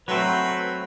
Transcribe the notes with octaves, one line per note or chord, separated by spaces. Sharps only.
F#3 A3 C4 B4